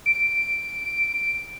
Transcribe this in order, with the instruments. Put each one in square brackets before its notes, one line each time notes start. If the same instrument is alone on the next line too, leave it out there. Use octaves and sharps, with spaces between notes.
[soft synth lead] D7